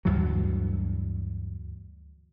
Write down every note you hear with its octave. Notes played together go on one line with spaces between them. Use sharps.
D2 G2 E3 F#3